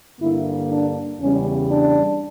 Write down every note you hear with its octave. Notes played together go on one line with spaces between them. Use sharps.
G2 D3 A#3 E4
D4
E2 C#3 G3 C#4
D4